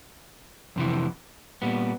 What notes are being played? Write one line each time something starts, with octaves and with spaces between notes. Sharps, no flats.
F2 C3 E3
A#2 G3 B3